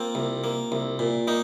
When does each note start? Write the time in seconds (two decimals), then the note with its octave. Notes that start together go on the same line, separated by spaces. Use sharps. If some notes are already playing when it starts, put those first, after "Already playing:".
Already playing: A#3 C4 F4
0.15 C2
0.44 A#3
0.72 C2
0.99 A#2
1.27 A#3 D#4